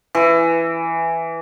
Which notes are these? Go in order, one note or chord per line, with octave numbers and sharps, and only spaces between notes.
E3